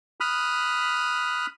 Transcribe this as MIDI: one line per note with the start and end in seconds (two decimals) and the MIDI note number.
0.20 1.46 83
0.20 1.46 87
0.20 1.46 89
0.20 1.46 90